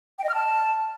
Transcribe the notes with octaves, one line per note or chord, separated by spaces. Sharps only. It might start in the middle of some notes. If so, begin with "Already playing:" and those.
G5
D#5
F6
A5